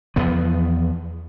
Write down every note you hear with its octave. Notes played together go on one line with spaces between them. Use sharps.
E2 F3 B3